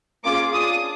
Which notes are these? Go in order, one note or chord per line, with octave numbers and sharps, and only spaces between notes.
A#3 C#4 F4 G#4 D6
D4 F4 G#4 D#6